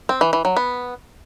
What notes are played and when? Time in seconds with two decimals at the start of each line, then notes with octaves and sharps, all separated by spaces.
0.09 C4
0.21 E3
0.33 E3
0.45 F#3
0.57 B3